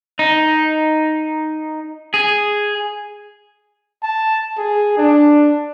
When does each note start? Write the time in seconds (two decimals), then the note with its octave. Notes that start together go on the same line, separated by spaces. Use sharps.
0.19 D#4
2.14 G#4
4.03 A5
4.58 G#4
4.97 D4